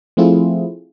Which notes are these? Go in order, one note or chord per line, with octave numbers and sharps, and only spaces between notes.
F3 A3 C4 E4 F4 G#4